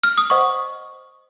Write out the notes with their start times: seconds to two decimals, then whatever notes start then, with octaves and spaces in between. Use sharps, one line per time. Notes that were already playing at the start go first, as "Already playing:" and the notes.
0.03 F6
0.18 D#6
0.30 C5 D#5 F#5 C#6